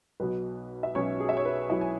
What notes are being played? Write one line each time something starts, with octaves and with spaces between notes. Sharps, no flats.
B1 B2 B4
E5
B1 B2 C#4 C#5
G#4
E5
C#5
B4
B1 B2 E4 E5
G#5